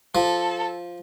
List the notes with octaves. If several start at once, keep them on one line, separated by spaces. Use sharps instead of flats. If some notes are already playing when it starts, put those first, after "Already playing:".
F3 A4